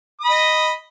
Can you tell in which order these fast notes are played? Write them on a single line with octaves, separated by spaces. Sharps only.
D#6 B5 D#5